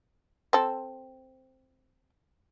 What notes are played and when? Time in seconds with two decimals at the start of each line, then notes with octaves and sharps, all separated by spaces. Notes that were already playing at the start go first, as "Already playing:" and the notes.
0.53 C4 A4